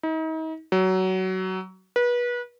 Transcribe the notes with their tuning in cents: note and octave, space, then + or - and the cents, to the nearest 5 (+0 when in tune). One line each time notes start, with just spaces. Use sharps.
D#4 +40
F#3 +20
B4 -30